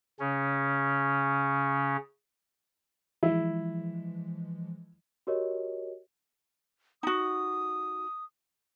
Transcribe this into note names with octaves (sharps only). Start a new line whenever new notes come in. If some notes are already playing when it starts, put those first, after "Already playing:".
C#3 C#4
E3 F3 G#3 E4
F#4 G4 A#4 C#5 D#5
D#4 F#4 D#6